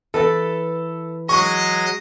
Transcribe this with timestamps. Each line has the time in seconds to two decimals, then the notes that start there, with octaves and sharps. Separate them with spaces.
0.14 E3 A4 B4 A5
1.29 F#3 G#3 D#5 C#6